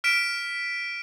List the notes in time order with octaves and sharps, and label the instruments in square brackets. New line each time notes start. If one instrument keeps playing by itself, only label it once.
[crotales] F6 B6 D7 E7